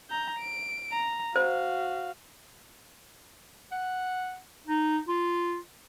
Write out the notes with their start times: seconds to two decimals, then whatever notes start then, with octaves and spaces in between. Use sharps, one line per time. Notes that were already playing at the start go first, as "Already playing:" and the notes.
0.10 A#5 G6
0.39 D7
0.92 A#5
1.36 F#4 C5 F5
3.72 F#5
4.67 D#4
5.08 F4